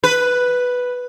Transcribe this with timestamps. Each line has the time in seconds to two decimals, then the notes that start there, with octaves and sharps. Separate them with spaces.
0.04 B4